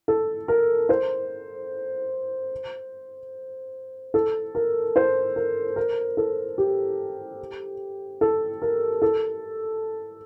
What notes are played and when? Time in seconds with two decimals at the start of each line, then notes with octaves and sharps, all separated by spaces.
0.08 A4
0.48 A#4
0.89 C5
4.14 A4
4.55 A#4
4.96 C5
5.36 A#4
5.76 A#4
6.17 A4
6.58 G4
8.21 A4
8.62 A#4
9.02 A4